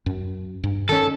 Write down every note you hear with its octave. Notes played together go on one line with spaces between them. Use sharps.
F#2
G2
D#3 G3 C#4 A4